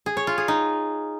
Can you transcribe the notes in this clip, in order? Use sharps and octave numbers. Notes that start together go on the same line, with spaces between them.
G#4
C#5
F4
G#4
D#4